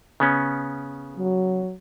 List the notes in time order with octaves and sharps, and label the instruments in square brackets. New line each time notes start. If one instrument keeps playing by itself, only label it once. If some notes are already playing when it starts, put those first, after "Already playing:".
[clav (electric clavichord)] C#3 B3 C#4
[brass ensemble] F#3